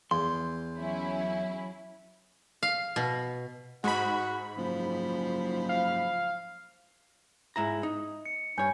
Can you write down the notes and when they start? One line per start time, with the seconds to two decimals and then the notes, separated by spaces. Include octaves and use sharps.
0.11 E2 C6
0.77 F#3 C#4 E4
2.63 F5
2.96 B2
3.84 G#2 F#4 B5
4.57 F#1 F3
5.69 F5
7.56 G#2 E4 A#5
7.83 D#4
8.25 C#7
8.58 G2 C#5 G#5 G6